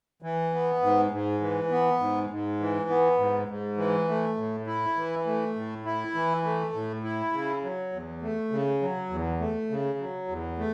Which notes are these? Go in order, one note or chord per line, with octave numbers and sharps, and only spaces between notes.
E3
B3
G#2
G#2
E3
B3
G#2
G#2
E3
B3
G#2
G#2
E3
A3
A2
E4
E3
A3
A2
E4
E3
A3
A2
E4
C#3
F#3
E2
A3
C#3
F#3
E2
A3
C#3
F#3
E2
A3